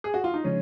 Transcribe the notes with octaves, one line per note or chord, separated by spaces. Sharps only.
G#4
F#4
F4
D#4
C#3 F3 G#3 C#4